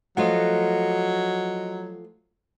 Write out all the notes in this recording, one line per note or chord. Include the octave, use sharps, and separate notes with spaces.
F3 F#3 A3 F4 D#5 F#5